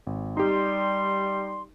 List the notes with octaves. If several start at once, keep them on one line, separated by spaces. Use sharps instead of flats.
G#1
G3 D#4 G4 C6